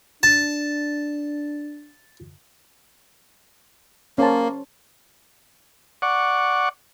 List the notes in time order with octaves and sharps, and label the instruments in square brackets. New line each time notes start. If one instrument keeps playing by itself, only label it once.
[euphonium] D4 [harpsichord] A5
[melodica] A#3 [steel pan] C#4 C5 A5
[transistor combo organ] D5 F#5 C#6